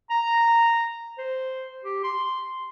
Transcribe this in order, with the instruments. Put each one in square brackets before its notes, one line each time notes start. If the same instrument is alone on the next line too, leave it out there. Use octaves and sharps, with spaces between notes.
[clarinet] A#5
C5
G4
C6